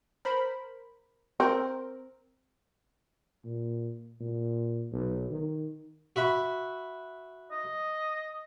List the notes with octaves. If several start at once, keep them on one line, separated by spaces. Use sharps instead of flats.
A#4 C5 B5
C4 A#4
A#2
A#2
B1
D#3
F#4 E5 B5
D#5